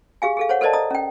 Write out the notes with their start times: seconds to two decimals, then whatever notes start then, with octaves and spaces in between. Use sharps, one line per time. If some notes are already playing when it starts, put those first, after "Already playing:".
0.22 G4 G#4 F5 G#5
0.37 G#4 A4 F5
0.49 C5 C#5 F#5
0.61 A4 A#4 C5 D5 D#5 A5
0.73 D#5 A#5 D#6
0.91 C#4 G5